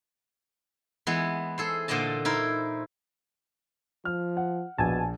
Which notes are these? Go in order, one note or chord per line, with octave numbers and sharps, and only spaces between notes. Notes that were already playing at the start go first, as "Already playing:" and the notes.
E3 G#3 B3
G#4 A4 C5
A#2 D3 C5 D5 D#5 A5
D#4 E4 A#4 C5
F3 F6
F#5
A#1 B2 G#5 A5